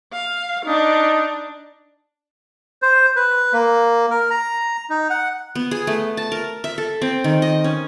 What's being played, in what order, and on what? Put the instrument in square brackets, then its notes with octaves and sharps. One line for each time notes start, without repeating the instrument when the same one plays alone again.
[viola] F5
[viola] D4 [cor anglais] D#4
[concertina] C5
B4
A#3
A#4
A#5
D#4
F#5
[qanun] B3
G#4
A3
A5
A#4
E5
A4
C4
D#3
D#5
C#4